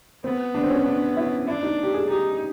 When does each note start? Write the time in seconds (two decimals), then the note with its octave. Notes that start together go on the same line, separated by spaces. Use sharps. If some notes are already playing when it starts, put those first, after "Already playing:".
0.24 B3 C4
0.55 D4
0.64 C4
0.70 C#4
0.86 D4
1.17 E4
1.48 D4 E4
1.63 D#4
1.83 G4
1.94 G#4
2.10 D#4 G4